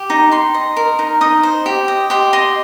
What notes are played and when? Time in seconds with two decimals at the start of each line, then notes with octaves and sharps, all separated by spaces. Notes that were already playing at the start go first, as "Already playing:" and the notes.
Already playing: G4
0.10 D#4
0.32 D#4 C6
0.54 D#5
0.76 A#4
0.99 D#4
1.21 D#4 D#6
1.43 C5
1.66 G4
1.88 D#5
2.10 G4 C6
2.33 D#5 C6